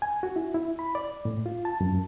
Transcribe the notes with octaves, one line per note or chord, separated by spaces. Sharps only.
G#5
F#4
E4
E4
B5
D5
A2
F4
A5
F#2